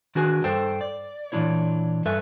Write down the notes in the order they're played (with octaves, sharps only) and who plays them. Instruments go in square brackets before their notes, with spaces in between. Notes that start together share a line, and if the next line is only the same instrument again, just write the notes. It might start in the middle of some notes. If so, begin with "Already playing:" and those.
[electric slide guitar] D#3 D4 F#4 G#4 B4 G#5
G2 A4 C5 G5
D5
A#2 E3 C#4 D4 E4 C#5
G2 A4 B4 E5 G#5